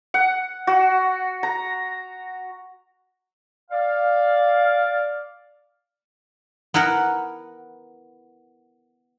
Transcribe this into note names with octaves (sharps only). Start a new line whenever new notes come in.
F#5
F#4
A#5
D5 F5
B3 E4 A#4 F#5